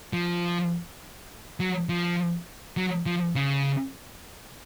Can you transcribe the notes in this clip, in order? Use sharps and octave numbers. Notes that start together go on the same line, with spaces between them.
F3
F#3
F3
F#3
F3
C#3